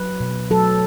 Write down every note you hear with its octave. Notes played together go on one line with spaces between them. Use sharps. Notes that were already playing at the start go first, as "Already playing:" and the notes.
Already playing: F#3 B4
B2
F#3 A4